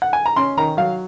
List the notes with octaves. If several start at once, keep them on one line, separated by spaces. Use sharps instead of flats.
F#5
G#5
A#5
C#4 C6
D#3 A#5
F#3 F5